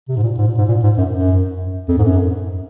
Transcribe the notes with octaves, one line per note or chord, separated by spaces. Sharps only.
C3
G#2
A#2
G#2
A#2
G#2
A#2
G#2
F#2
F#2
F2
G#2
F#2